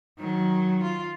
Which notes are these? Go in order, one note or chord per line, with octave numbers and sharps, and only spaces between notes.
D#3 F#3
F4